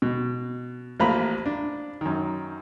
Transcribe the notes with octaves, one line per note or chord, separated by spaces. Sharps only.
B2
A1 F3 A#3 F4 A#5 B5
D4
F#2 D#3